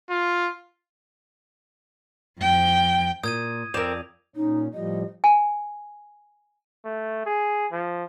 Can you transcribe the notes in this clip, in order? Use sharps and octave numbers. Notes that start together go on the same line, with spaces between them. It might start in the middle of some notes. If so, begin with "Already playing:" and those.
F4
F2 G5
A#2 D#6 G6 G#6 D#7
F2 C4 A#4 D5 F7
A#2 C#4 D#4
A2 F3 G3 D#5
G#5
A3
G#4
F3